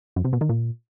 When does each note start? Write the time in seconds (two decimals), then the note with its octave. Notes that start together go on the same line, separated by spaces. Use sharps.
0.16 F#2
0.25 C3
0.33 B2
0.41 D#3
0.49 A#2